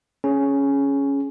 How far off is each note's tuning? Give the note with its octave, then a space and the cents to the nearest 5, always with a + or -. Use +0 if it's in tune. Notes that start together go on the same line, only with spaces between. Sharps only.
C#4 +0 G#4 +15